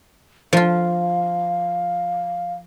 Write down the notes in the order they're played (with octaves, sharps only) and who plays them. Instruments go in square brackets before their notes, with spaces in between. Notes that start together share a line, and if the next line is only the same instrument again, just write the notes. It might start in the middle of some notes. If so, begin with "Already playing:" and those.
[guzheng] F3 F4 [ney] F5